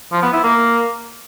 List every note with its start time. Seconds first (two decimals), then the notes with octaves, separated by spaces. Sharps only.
0.12 F3
0.23 B3
0.33 E4
0.44 A#3